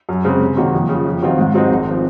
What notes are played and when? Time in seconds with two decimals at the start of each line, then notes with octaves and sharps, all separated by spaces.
0.09 F#2
0.24 C#3 G#3 C4
0.41 C3
0.57 D#3 F#3 A#3
0.74 F2
0.89 C#3
0.94 F3
1.05 F2
1.22 D#3 F#3 C4 F4
1.38 G#2
1.54 F#3 C4 D#4 G#4
1.71 G#1
1.89 F3 C4